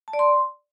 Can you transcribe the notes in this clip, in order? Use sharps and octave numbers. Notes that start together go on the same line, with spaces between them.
A5
D5
C6